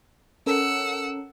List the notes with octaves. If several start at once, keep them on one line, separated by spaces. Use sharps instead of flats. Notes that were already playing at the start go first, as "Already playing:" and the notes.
C#4 A4 A#4 F#5 E6